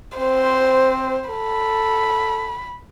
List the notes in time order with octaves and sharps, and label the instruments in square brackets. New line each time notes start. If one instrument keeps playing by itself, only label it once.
[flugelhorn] C4 [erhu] C5
[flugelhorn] A4 [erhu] B5